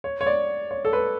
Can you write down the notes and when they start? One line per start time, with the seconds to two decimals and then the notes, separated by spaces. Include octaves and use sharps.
0.04 C#5
0.21 C#5
0.26 D5
0.71 C#5
0.85 A4
0.93 B4